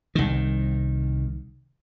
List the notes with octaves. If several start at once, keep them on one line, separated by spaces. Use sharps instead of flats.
C2 D#3